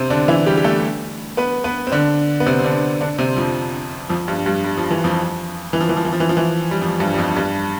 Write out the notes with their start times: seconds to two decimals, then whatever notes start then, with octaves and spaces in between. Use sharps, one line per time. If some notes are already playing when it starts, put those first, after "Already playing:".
Already playing: C3 C4
0.10 D3 D4
0.28 E3 E4
0.46 G3 G4
0.57 G4
0.64 A3 A4
1.37 B3 B4
1.64 B3 B4
1.87 C4
1.92 D3 D4
2.40 B3
2.46 C3 C4
2.59 C4
2.64 D3 D4
3.01 D3 D4
3.19 C3 C4
3.36 F2 F3
4.10 F2 F3
4.28 G2 G3
4.46 G2 G3
4.64 G3
4.78 F3
4.91 E3
5.04 F2 F3
5.73 E3
5.81 F3
5.89 E3
5.97 F3
6.05 E3
6.13 F3
6.20 E3
6.29 F3
6.37 E3
6.71 G3
6.81 F2 F3
7.00 G2 G3
7.14 G3
7.18 F2 F3
7.36 G2 G3